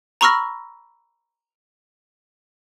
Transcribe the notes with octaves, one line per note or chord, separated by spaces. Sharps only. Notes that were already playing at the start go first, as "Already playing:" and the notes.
A#5 B5 C#6 E6 F6 A#6